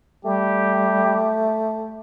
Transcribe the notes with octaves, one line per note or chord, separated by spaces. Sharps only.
G3 A3 G4